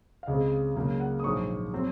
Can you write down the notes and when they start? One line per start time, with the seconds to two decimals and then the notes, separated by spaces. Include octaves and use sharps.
0.23 F5
0.28 C#2 C#3 G#3 C4 D#5
0.76 C#2 C#3 F#3 A#3
1.00 F#5
1.20 D#6
1.24 A#1 G#2 F#3 C#6
1.73 F#3 C4